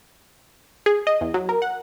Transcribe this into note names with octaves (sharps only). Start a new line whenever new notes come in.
G#4
D#5
E2
F#3
A#4
F#5